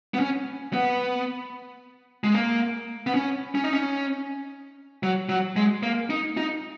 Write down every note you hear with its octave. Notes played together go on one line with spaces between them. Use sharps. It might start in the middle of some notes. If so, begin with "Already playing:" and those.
B3
C#4
B3
G#3
A#3
B3
C#4
C#4
D#4
C#4
F#3
F#3
G#3
A#3
D#4
D#4